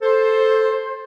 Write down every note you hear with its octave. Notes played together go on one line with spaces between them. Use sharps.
A4 C5